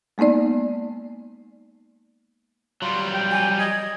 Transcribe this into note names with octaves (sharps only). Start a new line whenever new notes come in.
G#3 A#3 B3 D#4 D5
F#3 G3 F4
G5
G#5
D#5 G#6